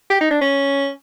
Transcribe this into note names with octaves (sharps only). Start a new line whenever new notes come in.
G4
D#4
D4
C#4